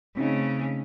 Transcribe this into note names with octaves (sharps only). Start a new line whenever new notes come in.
C#3 A3 C4 C#4 D#4